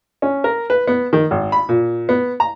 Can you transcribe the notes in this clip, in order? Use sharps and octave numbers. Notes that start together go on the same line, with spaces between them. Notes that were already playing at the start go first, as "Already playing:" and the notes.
C#4
A#4
B4
B3
D#3
G#1
B5
A#2
B3
A#5